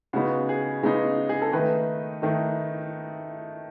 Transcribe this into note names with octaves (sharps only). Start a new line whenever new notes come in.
C#3 G#3 B3 D#4 F#4
G#4
C#3 G#3 B3 D#4 G#4
G#4
A4
D#3 A3 D#4 B4
D#3 A3 D#4